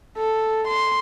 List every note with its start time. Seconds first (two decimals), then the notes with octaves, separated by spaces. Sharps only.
0.18 A4
0.67 C6